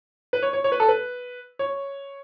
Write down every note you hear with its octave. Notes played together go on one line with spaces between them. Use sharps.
B4
C#5
C#5
C#5
B4
A4
B4
C#5